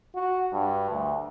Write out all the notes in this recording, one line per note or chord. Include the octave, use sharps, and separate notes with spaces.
F#4
G2
D2